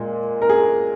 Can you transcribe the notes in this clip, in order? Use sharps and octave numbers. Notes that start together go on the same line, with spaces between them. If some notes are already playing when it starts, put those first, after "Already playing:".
Already playing: A#2 G#3
A#4
G#4